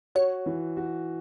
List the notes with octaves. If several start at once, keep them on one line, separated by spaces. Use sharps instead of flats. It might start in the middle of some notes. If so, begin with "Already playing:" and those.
F#4 C#5
E3
F#4